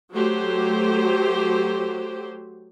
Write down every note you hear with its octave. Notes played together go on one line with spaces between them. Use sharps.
F#3 A3 G4 C5